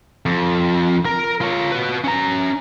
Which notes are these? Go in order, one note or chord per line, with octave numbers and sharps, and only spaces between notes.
F2
A#4
F4 C#5
F#4 B4
C#4 A#5